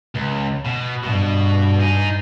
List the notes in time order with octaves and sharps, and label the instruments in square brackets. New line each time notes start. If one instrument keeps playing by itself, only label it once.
[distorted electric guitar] C#2
B2
[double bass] G2 [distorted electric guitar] B2
[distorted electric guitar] D#4 G#4